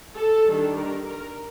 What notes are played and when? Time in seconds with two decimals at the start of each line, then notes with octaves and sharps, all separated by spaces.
0.17 A4
0.46 D#3 G3 D4
0.76 A#4
1.05 A#4